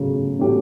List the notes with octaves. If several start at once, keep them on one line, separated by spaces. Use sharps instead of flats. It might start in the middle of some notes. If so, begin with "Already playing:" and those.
Already playing: C#3 F#3 A3 C#4
F#3 A3 C#4 G4